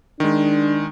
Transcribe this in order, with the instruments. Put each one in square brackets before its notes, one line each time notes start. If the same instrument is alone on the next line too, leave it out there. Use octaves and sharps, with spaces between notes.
[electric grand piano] D#3 G#3 [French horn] D4